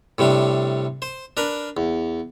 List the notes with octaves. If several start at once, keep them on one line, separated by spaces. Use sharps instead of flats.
A2 C3 G3 D4
C5
D4 A#4 B4
E2